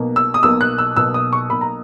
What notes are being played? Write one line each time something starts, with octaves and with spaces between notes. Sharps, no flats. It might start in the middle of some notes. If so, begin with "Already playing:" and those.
Already playing: B1 B2 A#3
E6
D#6
B1 B2 A#3 E6
F#6
E6
B1 B2 A#3 E6
D#6
C#6
B1 B2 A#3 B5
A#5